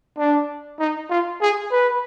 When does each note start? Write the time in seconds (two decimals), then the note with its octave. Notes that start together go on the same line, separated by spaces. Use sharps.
0.17 D4
0.79 D#4
1.10 F4
1.41 G#4
1.71 B4